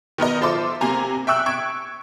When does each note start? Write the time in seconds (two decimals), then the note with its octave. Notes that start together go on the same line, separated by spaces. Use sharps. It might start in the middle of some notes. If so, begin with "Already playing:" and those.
0.18 D#3 B3 A#4 D#5
0.41 F4 A4 C5 E5 C6 D6
0.81 C3 A#3 G#5 A#5
1.27 E5 G5 C#6 E6 F#6
1.46 C#6 G#6 D7